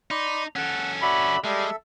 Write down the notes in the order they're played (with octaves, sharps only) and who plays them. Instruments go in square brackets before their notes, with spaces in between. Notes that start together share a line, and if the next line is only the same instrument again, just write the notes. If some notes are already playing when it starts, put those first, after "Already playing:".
[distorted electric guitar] D#4 [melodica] D5 B5 C6
[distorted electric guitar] C#4 A4 [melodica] F#5
[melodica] F#4 D5 E5 [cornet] B5
[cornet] G3 [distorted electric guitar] G#3 [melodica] A4 E5